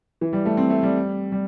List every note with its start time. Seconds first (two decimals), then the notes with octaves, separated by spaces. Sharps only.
0.21 E3
0.33 G3
0.45 A3
0.57 C4
0.70 A3
0.83 G3
1.32 G3